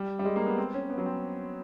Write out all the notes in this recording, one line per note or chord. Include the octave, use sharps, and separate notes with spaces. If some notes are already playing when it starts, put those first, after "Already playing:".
Already playing: G3
G3
G#3
A#3
B3
C4
C#4
B3
F#3
C4